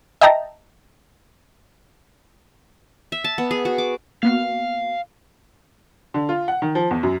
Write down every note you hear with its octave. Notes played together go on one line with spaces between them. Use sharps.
D#5 E5 G5 A5 A#5
E5
A5
B3
G#4
F#4
D6
A#3 B3 F#4 F5
D3
F4
F#5
D#3
F3
E2
F#2